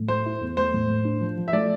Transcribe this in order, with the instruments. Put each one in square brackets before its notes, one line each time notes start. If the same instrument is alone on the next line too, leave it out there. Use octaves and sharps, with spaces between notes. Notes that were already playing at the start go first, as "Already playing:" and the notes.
Already playing: [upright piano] A2
[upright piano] A3 [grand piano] C5
[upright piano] E4
E2
[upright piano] A3 [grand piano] C5
[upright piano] A2
A2
D4
F3
F3
[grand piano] E5
[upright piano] A3 [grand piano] D5